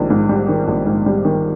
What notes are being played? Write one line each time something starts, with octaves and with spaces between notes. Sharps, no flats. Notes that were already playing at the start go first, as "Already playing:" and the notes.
Already playing: A#1 G#2 D#3 G3
G#2
G3
D#3
A#1
G#2
G3
D#3